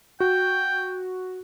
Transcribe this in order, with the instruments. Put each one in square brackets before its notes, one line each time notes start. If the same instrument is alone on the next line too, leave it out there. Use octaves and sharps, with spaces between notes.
[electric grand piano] F#4 [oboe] G5